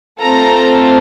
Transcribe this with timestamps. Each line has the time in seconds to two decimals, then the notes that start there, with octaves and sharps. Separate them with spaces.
0.21 A3 C4 F4 A4 A#5